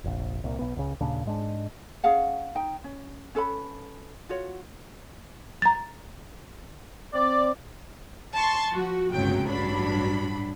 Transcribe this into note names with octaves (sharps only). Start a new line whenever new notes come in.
F1 A#1
C2 A#2
B1 B3
C#2 C#3
D#2 A#2 C#3 D4
G#2 G#3 D4
C#4 G#4 F5 F#5
D#4 G5
C#4
C#4 A4 B4 B5
F4 F#4 C#5
A#5 A6
C4 D5
A5 C6 C#6 A6
F3 F#4
G1 C#2 A2 C3 F#3 G5
A1 G2 F#3 D4 B5